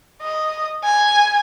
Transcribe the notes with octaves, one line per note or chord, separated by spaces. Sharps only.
D#5
G#5